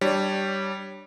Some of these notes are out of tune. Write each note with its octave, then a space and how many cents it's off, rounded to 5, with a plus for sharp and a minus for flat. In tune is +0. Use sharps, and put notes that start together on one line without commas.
G3 -10 D4 +15 C#5 +0